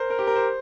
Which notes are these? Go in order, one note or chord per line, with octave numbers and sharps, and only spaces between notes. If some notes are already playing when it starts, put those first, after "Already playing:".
Already playing: A#4 C5
A#4
G4
A#4
C5